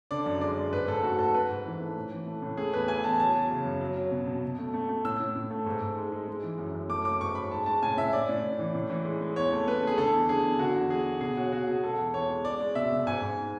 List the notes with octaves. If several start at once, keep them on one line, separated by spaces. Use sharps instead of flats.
D3 D5
F#2
G#3 D5
G#3
G#2 B4
G#2 A4
A3 F#4
G#2 A4
G#2 B4
G#2
E3
A3
A2
E3
A3
A2
A3 G#4
E2 B4
A3 G#5
E2 A5
F#3 A5
F#3
C#3
F#2
F#3
F#3
B2
B2
B2
A3
A3
A3
A2 E6
A2
A2
A3
G#2
G#2
G#3
G#3
G#3
E3
F#2
F#2
A3 D6
F#3 D6
G#2 C#6
F#3 B5
G#3 A5
G#3 A5
A2 G#5
A2 E5
A2 D5
A2
A2
E3
A2
E3
G#3
G#3
E2 C#5
A3
A3 B4
A3 G#4
D3 A4
E2
D3 G#4
E2
D3 F#4
E2
E2 G#4
E2
B2 G#4
F#3 F#4
F#3 F#4
B2 G#4
G#3 A4
E2
E2 C#5
G#3
G#3 D5
G#3
B2 E5
B2
G#2 G#5
G#2